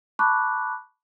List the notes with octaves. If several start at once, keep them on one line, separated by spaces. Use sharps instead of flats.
A5 B5 C#6 D6 F#6